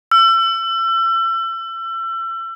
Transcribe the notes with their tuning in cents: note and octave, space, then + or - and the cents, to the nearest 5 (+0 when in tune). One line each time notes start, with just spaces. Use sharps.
E6 +35